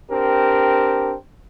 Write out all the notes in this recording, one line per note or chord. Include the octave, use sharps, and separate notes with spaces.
C4 D4 G4 A#4